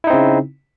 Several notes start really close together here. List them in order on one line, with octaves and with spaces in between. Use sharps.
E4 D#4 C4 C#3